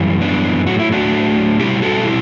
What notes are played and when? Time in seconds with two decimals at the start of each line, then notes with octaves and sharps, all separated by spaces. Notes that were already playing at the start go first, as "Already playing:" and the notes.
Already playing: F#2 E3 G3
0.21 B3 D4
0.67 A2 F#3 A3 F#4
0.79 E4
0.92 D4 F#4
1.59 B2 G3 E4 G4
1.82 F#4 A4
2.00 F#4
2.05 E4 G4